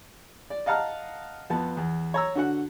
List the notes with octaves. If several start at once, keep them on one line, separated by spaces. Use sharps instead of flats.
D5
D#5 F5 F#5 A5 A#5 F6
F2 B3 A5
E2
C#5 A#5 E6
D3 F#4 F#5